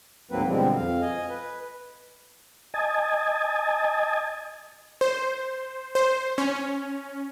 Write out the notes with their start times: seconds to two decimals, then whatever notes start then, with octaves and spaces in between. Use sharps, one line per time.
0.31 D2 G#2 F#3 A#3 C4 B4
0.46 B2 D3 F3 G3 G#3 C4
0.75 F2 F5
1.02 D#5 G#5
1.30 B4
2.74 D#5 G#5 A5
5.01 C5
5.95 C5
6.38 C#4